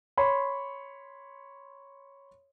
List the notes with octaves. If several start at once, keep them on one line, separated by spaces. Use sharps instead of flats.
C#5 B5 C6